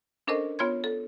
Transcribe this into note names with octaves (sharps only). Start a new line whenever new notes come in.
C#4 D4 A4 A#4 C5 D#5
B3 F4 C#5 C6 G#6
A4